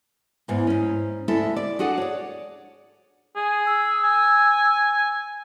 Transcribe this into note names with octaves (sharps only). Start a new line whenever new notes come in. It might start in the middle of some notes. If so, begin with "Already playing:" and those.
E2 G#2 E3
G#2 C#4
D2 G#3 E4 A4
D5
D4 F#4 G#4 A4 F#5
C#5 D5
G#4
E6
G#5